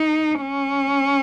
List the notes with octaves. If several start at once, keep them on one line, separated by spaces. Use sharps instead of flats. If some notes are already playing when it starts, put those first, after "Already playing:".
Already playing: D#4
C#4